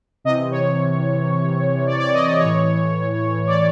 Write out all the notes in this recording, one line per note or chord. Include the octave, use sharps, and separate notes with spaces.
C3 E3 D#5
C#5
D5
D5
D#5
D5
A2 E3 C#5
D5